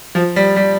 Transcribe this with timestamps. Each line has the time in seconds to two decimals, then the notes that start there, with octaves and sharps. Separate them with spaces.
0.15 F3
0.36 G3
0.56 G3